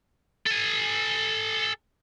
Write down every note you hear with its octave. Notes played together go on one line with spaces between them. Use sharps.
A4 G#5